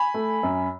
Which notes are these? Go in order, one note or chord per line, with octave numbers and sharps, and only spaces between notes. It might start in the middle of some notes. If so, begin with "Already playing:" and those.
Already playing: G#5 B5
A3
F#2